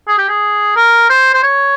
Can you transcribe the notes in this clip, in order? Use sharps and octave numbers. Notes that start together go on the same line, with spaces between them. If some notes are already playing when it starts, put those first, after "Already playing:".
G#4
G4
G#4
A#4
C5
C5
C#5